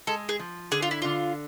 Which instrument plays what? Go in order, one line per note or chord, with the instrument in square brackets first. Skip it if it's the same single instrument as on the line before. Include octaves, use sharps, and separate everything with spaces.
[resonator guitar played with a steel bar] G#3 [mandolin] A4
[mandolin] G#4
[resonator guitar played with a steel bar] F3
[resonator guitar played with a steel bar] D3 [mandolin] G#4
[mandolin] F4
E4
[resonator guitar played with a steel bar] D3 [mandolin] F4